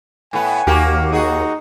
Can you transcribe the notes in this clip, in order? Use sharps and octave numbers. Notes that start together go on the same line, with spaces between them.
A2 B3 G#5
D#2 A#3 F#4 G4
D#4 F#4 G#4